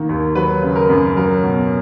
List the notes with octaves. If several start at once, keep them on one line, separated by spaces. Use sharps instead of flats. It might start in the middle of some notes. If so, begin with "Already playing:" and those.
Already playing: D#3 A#3
D#2
F#3 B4
C#3
A#4
F#2
F#3 A#4
B2